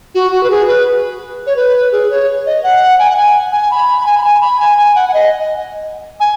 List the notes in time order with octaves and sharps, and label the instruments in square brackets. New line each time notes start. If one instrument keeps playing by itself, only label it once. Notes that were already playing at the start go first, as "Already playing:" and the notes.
[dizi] F#4
F#4
B4
G#4
B4
C#5
B4
G#4
C#5
D#5
F#5
G#5
F#5
G#5
G#5
B5
B5
G#5
B5
G#5
B5
G#5
G#5
F#5
F#5
D#5
G#5